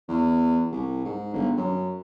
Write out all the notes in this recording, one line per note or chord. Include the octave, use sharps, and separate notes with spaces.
E2
C2
G#2
G1
F#2